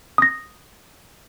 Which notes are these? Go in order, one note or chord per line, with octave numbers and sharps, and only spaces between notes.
D#6 A#6